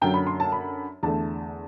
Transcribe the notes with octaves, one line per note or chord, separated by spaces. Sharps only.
F#2 D3 F#3 G5
B5
C6
A5
B5
E2 D3 A3 A5